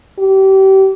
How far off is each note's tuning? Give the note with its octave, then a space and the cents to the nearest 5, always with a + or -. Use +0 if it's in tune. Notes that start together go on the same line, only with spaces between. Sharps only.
G4 -30